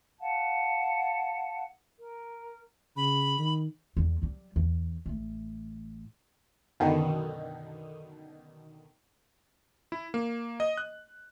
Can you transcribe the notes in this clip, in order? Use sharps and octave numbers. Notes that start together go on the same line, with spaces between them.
F5 F#5 A5
A#4
C#3 B5
D#3
E2 G3
F#3 G3
E2
A1 A3
F#2 B2 D3 D#3
E4
A#3
D#5
F#6